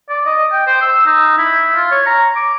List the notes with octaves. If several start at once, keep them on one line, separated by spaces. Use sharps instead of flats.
D5
D#5
G5
C5
E6
D#4
E4
F4
C#5
A#5
D6